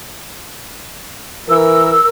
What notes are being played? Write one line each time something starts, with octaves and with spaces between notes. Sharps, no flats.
E3 A#4 E6